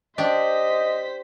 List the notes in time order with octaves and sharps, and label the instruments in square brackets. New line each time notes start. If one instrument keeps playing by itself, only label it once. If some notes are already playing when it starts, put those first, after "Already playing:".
[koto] D4 G4 [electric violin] C5 B6 [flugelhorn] D#5